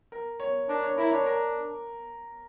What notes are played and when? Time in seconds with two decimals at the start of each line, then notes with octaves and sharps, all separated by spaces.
0.12 A#4
0.40 C#5
0.69 D4 A#4
0.83 C#5
0.98 E4 A#4
1.12 D4 C#5
1.26 A#4